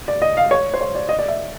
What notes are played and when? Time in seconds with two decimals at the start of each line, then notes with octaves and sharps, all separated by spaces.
0.08 D5
0.22 D#5
0.37 F5
0.51 C#5
0.74 C5
0.81 C#5
0.95 D5
1.09 D#5
1.19 D5
1.28 E5